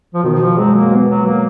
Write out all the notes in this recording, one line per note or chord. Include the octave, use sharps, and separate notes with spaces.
F3
B2 D#3
F3
F#3 G#3
A#3
B3
F#3
A#3